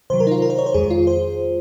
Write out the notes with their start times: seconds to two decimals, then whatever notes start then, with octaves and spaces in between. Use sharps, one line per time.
0.10 C3 D#3 F#3 C5
0.20 A#4
0.27 D#4
0.31 F4
0.42 A#4
0.50 C5
0.58 C#5
0.66 C5
0.74 F2 D#3 G#3 G#4
0.90 F4
1.07 C5